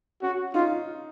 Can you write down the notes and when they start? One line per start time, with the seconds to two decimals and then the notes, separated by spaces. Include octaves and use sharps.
0.22 C#4 F#4
0.54 D#4 F4